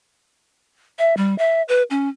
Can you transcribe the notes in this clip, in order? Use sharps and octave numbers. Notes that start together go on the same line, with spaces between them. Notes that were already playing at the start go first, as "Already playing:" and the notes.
E5
G3
E5
B4
C#4